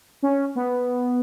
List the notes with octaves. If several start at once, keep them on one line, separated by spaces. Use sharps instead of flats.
C#4
B3